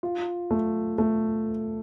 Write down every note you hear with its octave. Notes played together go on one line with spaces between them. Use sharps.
F4
A3
A3